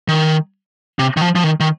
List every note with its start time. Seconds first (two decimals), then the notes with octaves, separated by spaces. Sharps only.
0.08 D#3
0.99 C3
1.17 D#3
1.21 F3
1.35 F3
1.44 D#3
1.60 D#3